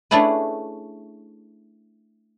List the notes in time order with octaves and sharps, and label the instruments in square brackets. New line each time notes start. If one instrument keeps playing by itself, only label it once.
[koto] A3 C#4 D4 E4 G#4 B4